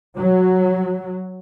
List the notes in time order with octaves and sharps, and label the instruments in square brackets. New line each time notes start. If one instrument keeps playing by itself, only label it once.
[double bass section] F#3